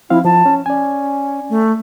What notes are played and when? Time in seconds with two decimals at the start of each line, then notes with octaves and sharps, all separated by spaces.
0.10 F3 C4 E4 F5
0.24 F3 A5
0.46 C#4
0.66 C#4 D5 G#5
1.49 A3